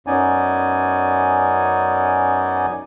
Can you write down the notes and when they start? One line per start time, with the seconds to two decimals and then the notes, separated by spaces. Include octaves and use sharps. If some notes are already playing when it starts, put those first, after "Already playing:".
0.07 F#2 B3 C#4 D#4 D5 G#5